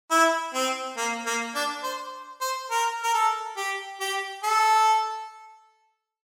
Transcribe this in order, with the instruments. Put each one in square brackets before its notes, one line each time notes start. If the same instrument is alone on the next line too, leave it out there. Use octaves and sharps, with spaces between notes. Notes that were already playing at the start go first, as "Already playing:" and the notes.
[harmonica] E4
C4
A#3
A#3
D4
C5
C5
A#4
A#4
A4
G4
G4
A4